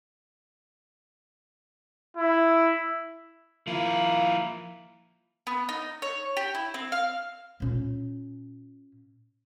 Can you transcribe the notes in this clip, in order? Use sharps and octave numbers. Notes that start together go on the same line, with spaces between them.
E4
F3 A#3 E4
B3
D#4
C#5
G4
E4
C4
F5
A#2 C#4